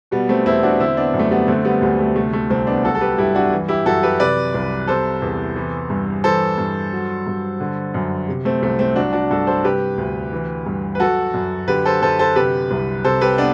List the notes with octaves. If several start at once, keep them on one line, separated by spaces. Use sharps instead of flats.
B2 G3 B3
A3 C4
E2 C4 E4
D4 F#4
D3 C4 E4
B3 D4
F#2
A3
G3 B3
D3 A3 C4
G3 B3
D2 G3
A3
C3 A3
A3
C2 A3 C4
B3 D4
F#3 F#4 A4
A4
G4 B4
G2 E4 G4
D4 F#4
E3
E4 G4
F#2 F#4 A4
G4 B4
C3 B4 D5
C2
C3 A4 C5
E2
E3
G2
E3 A4 C5
G2
F#3
G2
D3
F#2
C3
A3 C4
C2 A3
A3 C4
F#3 D4 F#4
D4 F#4
G2 F#4 A4
A4 C5
C3 G4 B4
D2
E3
G2
B4
F#3 F#4 A4
F#2
D3 G4 B4
A4 C5
F#2 A4 C5
A4 C5
C3 G4 B4
C2
C3 A4 C5
G4 B4
B3 D4